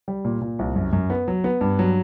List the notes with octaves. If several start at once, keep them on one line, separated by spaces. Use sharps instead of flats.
G3
A#2
A#2
C2
F#2
F#2
B3
F#3
B3
G2
F#3